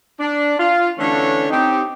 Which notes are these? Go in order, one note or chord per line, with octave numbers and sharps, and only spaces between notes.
D4
F4
D3 E3 A3 C#4 D4 C#5
C4 D#4 G4